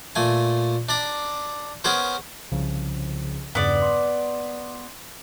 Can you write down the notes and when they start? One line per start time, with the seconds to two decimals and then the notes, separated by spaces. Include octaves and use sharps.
0.15 A#2 A3 G#5
0.89 D4 D5 A#5
1.84 B3 C#4 G#4 A#4 C5
2.51 C2 C#3 F3
3.55 E2 G2 C#3 B3 D5
3.82 C6